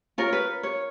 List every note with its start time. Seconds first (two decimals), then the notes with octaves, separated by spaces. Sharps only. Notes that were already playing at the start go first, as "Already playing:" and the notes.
0.18 C#4 F4 A#4 C#5
0.33 B4
0.63 C#5